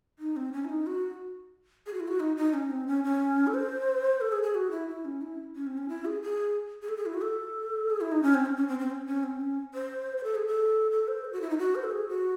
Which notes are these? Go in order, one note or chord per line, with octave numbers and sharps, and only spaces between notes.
D#4
C4
C#4
E4
D#4
F#4
G#4
F#4
E4
F#4
D#4
D#4
C#4
C4
C#4
C#4
A4
C5
A4
G#4
G#4
F#4
E4
E4
C#4
E4
C#4
C4
C#4
E4
G#4
G#4
G#4
A4
G#4
E4
F#4
A4
G#4
E4
D#4
C#4
C4
C#4
C#4
C4
C4
C#4
C#4
C4
C#4
C5
C5
A4
G#4
A4
A4
C5
A4
F#4
E4
D#4
F#4
C5
A4
G#4
F#4